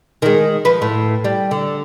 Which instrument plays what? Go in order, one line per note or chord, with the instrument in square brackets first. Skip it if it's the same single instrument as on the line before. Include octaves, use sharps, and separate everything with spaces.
[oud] D#3 G#3
F3 B4
A2
G3
D3